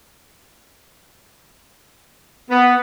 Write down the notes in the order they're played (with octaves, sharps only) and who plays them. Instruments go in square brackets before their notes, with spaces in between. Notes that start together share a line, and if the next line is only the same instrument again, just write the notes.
[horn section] B3